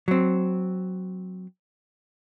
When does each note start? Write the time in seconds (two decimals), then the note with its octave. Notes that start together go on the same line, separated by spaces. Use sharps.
0.08 F#3 C4